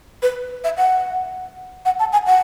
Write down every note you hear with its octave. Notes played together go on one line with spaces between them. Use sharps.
B4
E5
F#5
F#5
A5
G#5
F#5